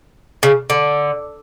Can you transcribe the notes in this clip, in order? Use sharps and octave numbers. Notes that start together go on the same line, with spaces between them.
C#3
D3